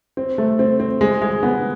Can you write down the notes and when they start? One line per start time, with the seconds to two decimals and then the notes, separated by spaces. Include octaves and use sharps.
0.17 C4
0.38 A3
0.59 C4
0.80 C4
1.01 G#3
1.22 G#3
1.43 B3